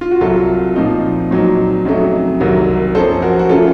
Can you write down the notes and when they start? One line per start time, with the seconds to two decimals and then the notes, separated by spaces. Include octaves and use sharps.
0.01 F4
0.11 F#4
0.21 C2 C3 F#3 F4 A4
0.75 A#2 F3 C4 D#4
1.31 A#2 F#3 C4 D#4
1.85 F2 C#3 F#3 A3 D#4
2.40 C2 C3 D#3 F#3
2.95 F#2 F3 A#3 C#4 A4 C5
3.22 F#4 A#4
3.39 F#4
3.49 C#3 A3 C#4 F4 A4